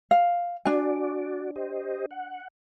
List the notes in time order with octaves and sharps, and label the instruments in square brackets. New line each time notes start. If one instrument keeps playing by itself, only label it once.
[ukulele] F5
[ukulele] D4 G#5 [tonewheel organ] F#4 D5
[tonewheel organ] G4 C5 D#5
F#5